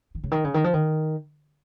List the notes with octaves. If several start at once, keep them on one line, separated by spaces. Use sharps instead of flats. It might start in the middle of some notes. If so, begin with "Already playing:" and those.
D#3
C#3
D#3
C#3
D#3
F3
D#3